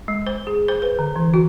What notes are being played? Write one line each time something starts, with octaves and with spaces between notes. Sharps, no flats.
G#3
C5
G#4
C5
B4
D3
E3
F#4